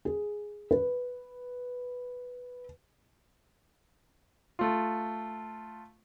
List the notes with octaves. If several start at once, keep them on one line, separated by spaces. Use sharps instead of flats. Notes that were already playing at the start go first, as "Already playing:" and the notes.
G#4
B4
A3 F4